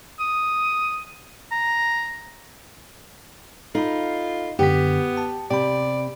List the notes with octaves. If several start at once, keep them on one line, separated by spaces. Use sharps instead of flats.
D#6
A#5
D#4 F4 A4 B5
F#2 D3 B3 G4 B6
A5
C3 D5 G5 B5